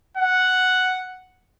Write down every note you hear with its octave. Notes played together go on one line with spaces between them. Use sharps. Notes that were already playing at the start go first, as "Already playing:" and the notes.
F#5